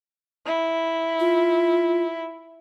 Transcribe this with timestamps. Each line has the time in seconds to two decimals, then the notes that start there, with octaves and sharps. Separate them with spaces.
0.46 E4
1.20 F4